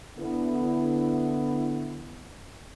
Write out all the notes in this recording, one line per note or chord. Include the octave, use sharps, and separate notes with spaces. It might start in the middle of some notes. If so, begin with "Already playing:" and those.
D3 B3 E4